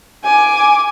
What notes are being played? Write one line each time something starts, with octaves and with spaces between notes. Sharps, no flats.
G#5 D6